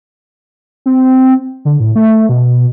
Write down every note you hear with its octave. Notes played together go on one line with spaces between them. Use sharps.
C4
D3
A2
A3
B2